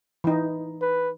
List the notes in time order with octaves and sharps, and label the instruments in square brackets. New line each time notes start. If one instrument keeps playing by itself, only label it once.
[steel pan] E3 D#4
[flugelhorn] B4